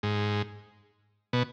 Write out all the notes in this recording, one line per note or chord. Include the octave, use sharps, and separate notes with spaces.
G#2
B2